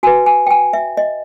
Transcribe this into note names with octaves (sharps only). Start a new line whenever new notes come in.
F#4 B4 G#5
G#5
G5
G#5
E5
D#5